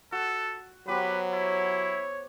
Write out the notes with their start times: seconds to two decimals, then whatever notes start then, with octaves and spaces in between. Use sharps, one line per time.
0.12 F#4 A4
0.88 F#3 B3 G4 B4 C5
1.33 E4 C#5